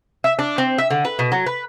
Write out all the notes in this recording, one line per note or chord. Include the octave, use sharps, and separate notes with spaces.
E5
D4
C4
E5
D3
B4
B2
F#3
B4